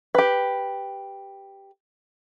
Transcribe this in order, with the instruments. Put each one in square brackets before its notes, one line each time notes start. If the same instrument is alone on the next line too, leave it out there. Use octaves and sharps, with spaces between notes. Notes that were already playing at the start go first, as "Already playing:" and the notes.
[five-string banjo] G4 B4